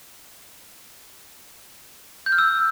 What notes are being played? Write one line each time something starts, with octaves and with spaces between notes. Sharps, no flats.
G6
F6
E6